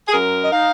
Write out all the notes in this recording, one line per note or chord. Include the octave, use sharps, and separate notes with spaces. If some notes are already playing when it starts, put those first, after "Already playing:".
G#4
F#2 A#4
D#5
D#4 F5